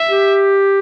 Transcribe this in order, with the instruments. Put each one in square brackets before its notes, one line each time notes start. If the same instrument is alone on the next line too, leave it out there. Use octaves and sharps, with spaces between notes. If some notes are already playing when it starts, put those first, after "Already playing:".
Already playing: [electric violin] E5
[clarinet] G4